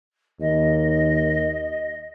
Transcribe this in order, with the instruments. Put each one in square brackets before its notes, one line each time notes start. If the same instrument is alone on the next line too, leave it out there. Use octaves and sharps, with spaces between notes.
[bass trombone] D#2 [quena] D#5